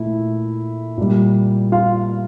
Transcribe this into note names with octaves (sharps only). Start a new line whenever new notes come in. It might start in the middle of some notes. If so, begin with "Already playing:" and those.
Already playing: A#2 A3 E4
A#2 G3
F4 F5